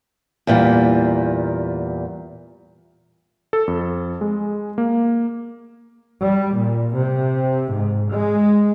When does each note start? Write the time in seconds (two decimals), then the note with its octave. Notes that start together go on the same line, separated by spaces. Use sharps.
0.47 E2 A#2 G3
3.53 A4
3.67 F2
4.21 G#3
4.78 A#3
6.23 G3
6.55 A#2
6.97 C3
7.73 G#2
8.12 G#3